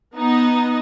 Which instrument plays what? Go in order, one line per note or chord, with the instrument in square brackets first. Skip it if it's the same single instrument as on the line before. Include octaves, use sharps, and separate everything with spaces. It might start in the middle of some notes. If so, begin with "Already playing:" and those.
[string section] B3 D#4